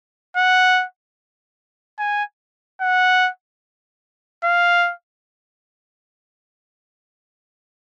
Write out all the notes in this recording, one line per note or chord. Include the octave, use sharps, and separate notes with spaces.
F#5
G#5
F#5
F5